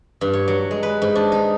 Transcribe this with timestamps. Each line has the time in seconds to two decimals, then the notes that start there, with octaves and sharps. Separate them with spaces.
0.21 G2
0.33 C#5
0.48 F#3
0.71 G#3
0.83 B4
1.02 G#2
1.15 D4
1.32 D#4